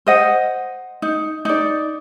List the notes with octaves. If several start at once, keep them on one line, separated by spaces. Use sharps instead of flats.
C5 D#5 F#5
D#4
D#4 D5